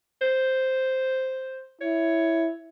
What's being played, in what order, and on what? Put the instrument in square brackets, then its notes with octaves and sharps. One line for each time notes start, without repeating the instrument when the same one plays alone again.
[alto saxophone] C5
[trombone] E4 [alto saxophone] C#5